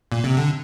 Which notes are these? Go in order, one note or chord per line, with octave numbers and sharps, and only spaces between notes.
A#2
C3
D3